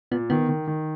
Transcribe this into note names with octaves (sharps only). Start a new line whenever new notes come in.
A#2 B3
D#3 B3
D#3
D#3